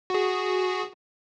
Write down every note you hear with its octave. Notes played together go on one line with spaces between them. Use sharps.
F#4 G#4